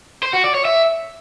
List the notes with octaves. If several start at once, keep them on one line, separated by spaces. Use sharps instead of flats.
C5
F#4
D5
C#5
E5